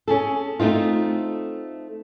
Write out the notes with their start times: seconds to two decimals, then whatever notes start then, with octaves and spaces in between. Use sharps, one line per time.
0.08 C#4 G#4 A4
0.60 A3 C4 D#4 F4